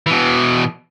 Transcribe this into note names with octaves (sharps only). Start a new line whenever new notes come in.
B2 E3